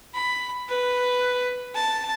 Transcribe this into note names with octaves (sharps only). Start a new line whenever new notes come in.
B5
B4
A5